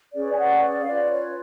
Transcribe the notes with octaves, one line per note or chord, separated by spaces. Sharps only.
C#4 G#4 B4 D5
G#5
D5 F#5
D5
F5
C#4 F4 B4 D5
C#5